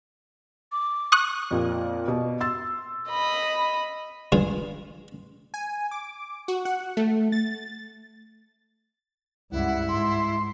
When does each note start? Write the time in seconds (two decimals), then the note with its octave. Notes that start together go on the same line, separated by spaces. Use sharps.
0.72 D6
1.12 C#6 D#6 F#6
1.51 F2 A#2
2.08 B2
2.41 C6 E6 A6
3.10 D#5 B5
4.32 G2 F4 G#4
5.54 G#5
5.91 D6
6.48 F#4
6.65 F#5
6.97 A3
7.32 A6
9.51 C#2 G2 E4 F#5
9.89 G#2 C6